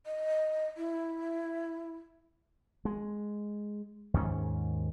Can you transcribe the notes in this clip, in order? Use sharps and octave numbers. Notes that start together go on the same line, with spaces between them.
D#5
E4
G#3
D#2 G#2 C#4